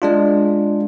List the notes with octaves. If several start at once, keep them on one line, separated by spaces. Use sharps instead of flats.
G#3 D4 F4